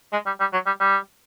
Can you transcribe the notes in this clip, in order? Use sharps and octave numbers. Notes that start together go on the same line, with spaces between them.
G#3
G3
G3
F#3
G3
G3